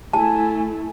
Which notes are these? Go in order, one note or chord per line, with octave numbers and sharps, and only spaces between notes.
A3 E4 G#5 A5